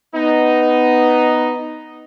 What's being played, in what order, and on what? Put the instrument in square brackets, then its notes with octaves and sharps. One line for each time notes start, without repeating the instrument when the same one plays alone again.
[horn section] B3 D#4